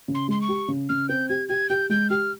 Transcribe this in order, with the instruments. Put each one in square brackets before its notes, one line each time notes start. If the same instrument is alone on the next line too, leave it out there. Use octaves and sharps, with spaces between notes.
[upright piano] C#3
[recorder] C6
[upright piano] G#3 [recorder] C6
[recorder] C#6
[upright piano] G4
C#3
[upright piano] C#3 [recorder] F6
[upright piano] C4 [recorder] G6
[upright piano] G4 [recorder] G#6
[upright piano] G4 [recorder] G#6
[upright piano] G4 [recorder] G6
[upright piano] G#3 [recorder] G6
[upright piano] G4 [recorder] F6